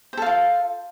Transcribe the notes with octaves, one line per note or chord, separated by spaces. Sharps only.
F4 A4 C5 F5